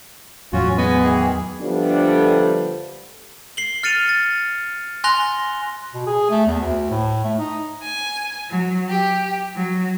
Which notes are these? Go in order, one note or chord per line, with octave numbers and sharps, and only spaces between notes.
E2 A2 F#3 C#4 F4 F#4
G#3 B3 D#5 G#5
D#3 E3 G#4
D3 F3 G3 A3 B3 D4
C7 F#7 G7
F6 A6 C#7 D#7 F7
A6
G#5 C6 F#6 A#6 F7 G7
B2
G#4
A3
E2
D2
A2
A3
D#4
G#5
F#3
G4
F#3